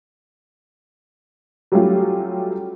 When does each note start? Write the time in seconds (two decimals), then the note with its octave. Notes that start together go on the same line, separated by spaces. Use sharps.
1.72 F#3 G3 A3 C#4 F4